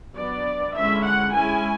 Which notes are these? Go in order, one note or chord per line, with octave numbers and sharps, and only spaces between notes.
F#3 B3 D4 D5
D3 G#3 C#4 E4 E5
F#5
G#3 C#4 E4 G#5